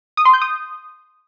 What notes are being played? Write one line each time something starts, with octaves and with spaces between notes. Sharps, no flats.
D#6
C6
G6
D#6